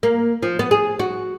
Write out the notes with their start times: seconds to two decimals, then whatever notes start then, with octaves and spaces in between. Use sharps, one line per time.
0.03 A#3
0.43 F3
0.59 B3
0.71 G#4
0.99 F#4